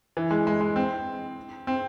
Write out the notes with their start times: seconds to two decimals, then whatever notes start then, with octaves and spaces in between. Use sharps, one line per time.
0.17 E3
0.31 G#3
0.47 G#3
0.61 G#3
0.76 C4
1.67 C4